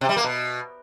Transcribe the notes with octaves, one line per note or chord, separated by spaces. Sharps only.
C3
G3
A#3
B2